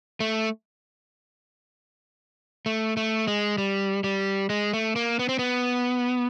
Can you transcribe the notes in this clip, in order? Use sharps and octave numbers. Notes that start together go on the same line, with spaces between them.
A3
A3
A3
G#3
G3
G3
G#3
A3
A#3
B3
C4
B3